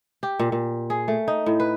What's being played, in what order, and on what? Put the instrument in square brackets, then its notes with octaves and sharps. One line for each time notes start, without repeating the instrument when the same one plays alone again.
[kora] G4
A#2
A#2
G#4
A3
D#4
A2
B4